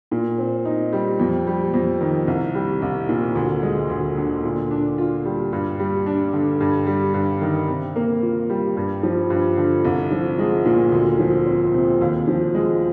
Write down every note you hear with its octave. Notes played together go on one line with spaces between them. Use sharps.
A#2
C4
D#4
G3
F2
G3
F2
D#3
C2
G3
C2
A#2
D2
G#3
D2
D3
A#2
D4
F4
G3
G2
G3
D4
D3
G2
G3
G2
D#3
C3
A#3
F4
G3
G2
F3
G2
D3
C2
F3
G#3
A#2
D2
F3
C4
C3
D#2
F3
G#3